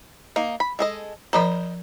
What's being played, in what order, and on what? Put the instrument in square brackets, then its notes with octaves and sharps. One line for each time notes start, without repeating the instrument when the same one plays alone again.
[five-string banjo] A#3 D#4
B5
G#3 A4 D#5
[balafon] F3 A#4 A#5 [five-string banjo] C5 D#5 B5